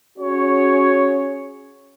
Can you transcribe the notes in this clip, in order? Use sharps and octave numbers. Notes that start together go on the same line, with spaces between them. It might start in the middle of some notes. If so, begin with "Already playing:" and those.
C#4 F#4 G#4 C#5